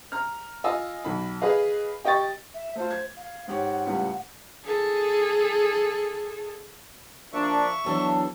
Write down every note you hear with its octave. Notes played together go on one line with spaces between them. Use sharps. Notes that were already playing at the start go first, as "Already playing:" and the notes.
A#5 F6
F4 D#5 G#5 E6
B1 B5
G#4 B4 D#5 F5
G4 D#5 G5 C#6 A6
E5
A3 F4 C5
G#6
F5
G#2 G4 C#5 F#5
C#2 A2 G3
G#4 A4
F3 A#3 D4 E5 C#6
E2 E3 F#3 D4 A4